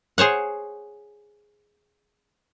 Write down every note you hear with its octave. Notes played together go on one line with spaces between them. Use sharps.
G#4 C5 C#5 F#5